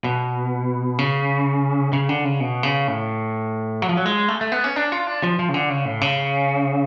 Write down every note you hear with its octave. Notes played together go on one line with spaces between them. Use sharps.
B2
C#3
C#3
D3
C#3
B2
C#3
A2
F#3
F3
F#3
G#3
A3
A3
B3
C#4
D4
F4
D4
F3
F3
C#3
D3
C#3
A2
C#3